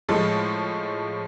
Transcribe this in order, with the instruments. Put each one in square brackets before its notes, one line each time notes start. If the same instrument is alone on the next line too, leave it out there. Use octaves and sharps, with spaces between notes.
[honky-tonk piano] A2 F3 G#3 A4